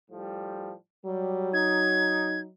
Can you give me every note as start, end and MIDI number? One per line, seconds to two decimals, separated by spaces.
0.10 0.73 45
0.10 0.73 53
0.10 0.73 55
1.06 2.52 54
1.06 1.52 55
1.54 2.44 63
1.54 2.40 92